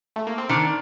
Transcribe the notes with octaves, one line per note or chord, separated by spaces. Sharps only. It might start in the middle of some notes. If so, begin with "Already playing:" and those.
A3
A#3
C4
D#3 D4